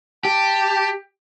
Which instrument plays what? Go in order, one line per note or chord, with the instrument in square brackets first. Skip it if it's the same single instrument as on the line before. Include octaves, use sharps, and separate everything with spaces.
[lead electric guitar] G4 [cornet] A5